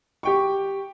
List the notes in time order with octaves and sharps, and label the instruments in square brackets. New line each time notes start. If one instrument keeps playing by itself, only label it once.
[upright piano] G4 G5 C#6